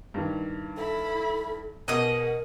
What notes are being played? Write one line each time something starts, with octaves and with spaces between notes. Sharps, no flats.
G2 D#3 E3
E4 A4 B5
B2 G#4 A#4 D#5 F#5 D#6